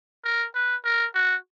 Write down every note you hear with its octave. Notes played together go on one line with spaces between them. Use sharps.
A#4
B4
A#4
F#4